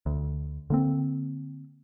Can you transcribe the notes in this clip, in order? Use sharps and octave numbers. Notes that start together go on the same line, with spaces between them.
D2
D3 A#3 C4